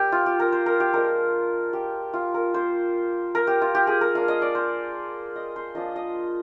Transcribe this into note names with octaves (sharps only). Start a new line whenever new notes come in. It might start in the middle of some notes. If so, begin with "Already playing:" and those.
Already playing: G3 G4 A#4
F4
G4
A#4
C5
A#4
G4
F3 G#3 D4 A#4
G4
F4
A#4
A#3 F4 C5
A#4
G4
F4
G4
G#4
A#4
A#3 D4 F4 F5
D#5
D5
C5
D#5
C5
F3 A#3 D4 F4 D#5
D#5